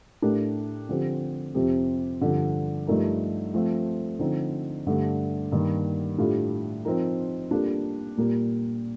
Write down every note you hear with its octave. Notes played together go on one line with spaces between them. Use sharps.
A2 A3 D4 G4 A#4
D3 F3 C4 G4
F2 C3 F3 C4 G4
G2 D3 F3
G2 F3 A3 D#4 A#4
F3 A3 C4 F4
D3 F3 C4 D#4
G2 D3 A3
G2 D#3 G3 A#3
A2 G3 D4 F4 A4
F3 C4 D#4 A#4
G3 A#3 D4 F4 A4
A#2 G3 A#3